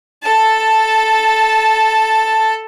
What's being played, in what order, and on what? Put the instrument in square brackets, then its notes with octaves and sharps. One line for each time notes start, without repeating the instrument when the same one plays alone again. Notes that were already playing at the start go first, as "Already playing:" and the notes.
[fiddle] A4 A5